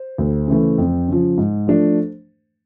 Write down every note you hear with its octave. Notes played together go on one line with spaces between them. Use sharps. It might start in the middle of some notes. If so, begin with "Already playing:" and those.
Already playing: C5
D2
C#3 E3 A3
F2
C#3 F3
G#2
F3 A3 D4